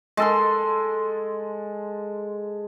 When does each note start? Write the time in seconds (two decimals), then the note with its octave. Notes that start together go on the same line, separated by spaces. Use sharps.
0.17 G#3 A4 C6